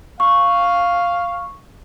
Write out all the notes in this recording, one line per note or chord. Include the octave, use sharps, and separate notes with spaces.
F5 C#6